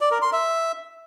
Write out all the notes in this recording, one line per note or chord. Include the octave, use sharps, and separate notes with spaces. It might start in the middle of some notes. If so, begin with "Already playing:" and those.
D5
A#4
C6
E5